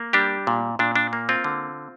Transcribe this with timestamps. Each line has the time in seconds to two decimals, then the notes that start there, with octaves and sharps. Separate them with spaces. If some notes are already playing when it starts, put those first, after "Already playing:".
Already playing: A#3
0.13 G3 D4 G4
0.47 A#2
0.79 A#2 D4
0.96 D4
1.13 A#3
1.29 C4 F4
1.44 D3